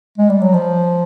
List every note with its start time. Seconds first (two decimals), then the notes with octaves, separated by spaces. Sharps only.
0.18 G#3
0.29 G3
0.41 F#3
0.54 F3